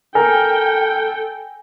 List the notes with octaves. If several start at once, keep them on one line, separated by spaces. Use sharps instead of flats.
A4 A#4 G5 G#5